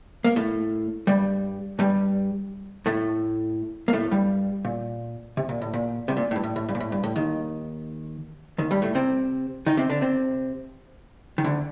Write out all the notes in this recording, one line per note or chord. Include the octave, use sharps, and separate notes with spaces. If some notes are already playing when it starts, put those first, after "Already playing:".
A#3
A2 A3
G2 G3
G2 G3
A2 A3
A#3
A2 A3
G2 G3
A#2
C3
A#2
A2
A#2
C2 C3
A#2
A2
G2
A2
A2
G2
A#2
A2
G2
A2
D#2 D#3
D#2 D#3
G2 G3
A2 A3
C3 C4
D#3 D#4
C3 C4
D3 D4
C3 C4
D#3
D2 D3